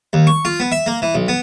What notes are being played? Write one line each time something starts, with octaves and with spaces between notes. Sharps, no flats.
D#2
C#6
F4
B3
E5
A#3
E3
B1
B3